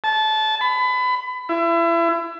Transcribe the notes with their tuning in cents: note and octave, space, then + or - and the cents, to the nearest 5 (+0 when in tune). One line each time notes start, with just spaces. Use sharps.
A5 -20
B5 +25
E4 +35